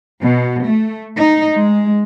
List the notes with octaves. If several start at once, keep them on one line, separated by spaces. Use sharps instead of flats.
B2
A3
D#4
G#3